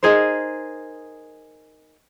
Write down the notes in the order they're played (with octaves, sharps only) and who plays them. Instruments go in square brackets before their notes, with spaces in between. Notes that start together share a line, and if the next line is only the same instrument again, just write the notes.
[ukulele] D#4 G#4 A#4 C5